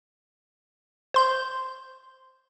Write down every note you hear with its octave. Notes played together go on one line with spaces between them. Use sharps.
C5 C6 G6